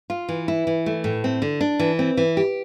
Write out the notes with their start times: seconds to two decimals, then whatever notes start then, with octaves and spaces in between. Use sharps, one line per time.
0.10 F4
0.29 E3
0.48 E4
0.67 E3
0.86 A3
1.04 A2
1.24 C4
1.42 D3
1.61 D4
1.79 E3
1.99 C4
2.17 E3
2.37 G4